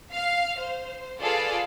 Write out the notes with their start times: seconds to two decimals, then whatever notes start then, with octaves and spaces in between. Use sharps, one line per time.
0.12 F5 F6
0.59 C5
1.21 F4 G#4 A4 B4 D5 F5